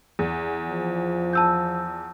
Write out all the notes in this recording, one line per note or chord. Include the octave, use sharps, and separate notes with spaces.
E2
F3
A5 E6 G6